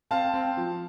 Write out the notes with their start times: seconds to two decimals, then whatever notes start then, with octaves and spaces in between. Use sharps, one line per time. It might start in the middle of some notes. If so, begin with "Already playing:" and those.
0.11 C4 F5 A5
0.33 C4
0.57 F3